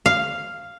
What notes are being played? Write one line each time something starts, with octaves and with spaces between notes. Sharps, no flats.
F5